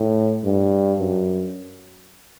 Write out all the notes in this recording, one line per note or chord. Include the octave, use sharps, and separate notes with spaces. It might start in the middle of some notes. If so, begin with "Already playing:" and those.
Already playing: A2
G2
F#2